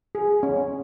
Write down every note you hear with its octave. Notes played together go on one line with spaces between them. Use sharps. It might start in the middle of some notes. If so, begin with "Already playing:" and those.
G#4
C#4